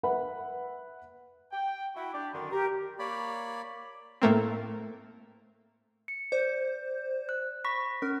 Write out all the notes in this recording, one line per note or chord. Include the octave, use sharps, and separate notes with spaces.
B4 E5 F#5 B5
G5
E4 F#4
D4 G4
F#2 D3 D#3
G4 A#4
A#3 C#5 D5 B5
A2 A3 A#3 C4
C#7
C5 D5
F#6
B5 C#6 A#6 B6
C#4 A#4